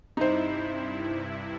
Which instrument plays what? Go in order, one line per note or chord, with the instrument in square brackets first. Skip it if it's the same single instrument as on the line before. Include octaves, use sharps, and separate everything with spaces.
[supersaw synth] G2 C3 E4 [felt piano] D#4 C5